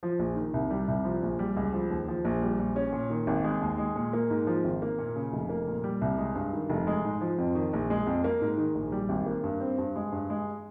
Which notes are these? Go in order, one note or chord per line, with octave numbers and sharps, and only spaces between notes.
F3
A#1
D#3
C2
G3
C2
F3
A#1
G3
C#2
F3
D#2
F3
A#1
G3
A#1
C#4
A#2
D#3
G#1
G#3
D#2
G#3
A#2
A#3
G#2
F3
G#1
A#3
A#2
C#3
F1
A#3
A#2
G3
C2
G#3
G2
D#3
F1
G#3
G#2
F3
F2
D#3
A#1
G#3
F2
A#3
G#2
D#3
A#1
G3
G#1
A#3
G2
C4
G2
G#3
G2
G#3